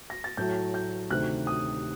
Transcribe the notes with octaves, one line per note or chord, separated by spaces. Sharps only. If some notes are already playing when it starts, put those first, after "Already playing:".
A#6
A6
A2 F#3 A3 G6
G6
D2 C3 D#3 F#6
D#6